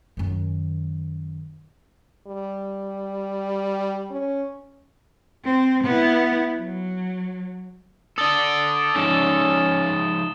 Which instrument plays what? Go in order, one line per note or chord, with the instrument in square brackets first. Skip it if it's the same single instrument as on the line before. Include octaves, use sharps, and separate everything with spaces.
[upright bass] F#2 D#3
[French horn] G3
C#4
[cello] C4
B3 E4
F#3
[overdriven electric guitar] A4 D5 [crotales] D#6 A6 G7
[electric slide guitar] F3 G#3 D#4 [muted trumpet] C#4 [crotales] A6 E7